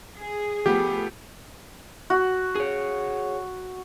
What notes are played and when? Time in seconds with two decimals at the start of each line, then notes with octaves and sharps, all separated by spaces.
0.18 G#4
0.66 F3 A3 B3 G4
2.10 F#4
2.55 G#4 C#5